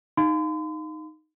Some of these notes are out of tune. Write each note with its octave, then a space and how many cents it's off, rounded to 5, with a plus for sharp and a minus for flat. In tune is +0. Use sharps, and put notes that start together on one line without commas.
D#4 +0 F5 +0 C6 -45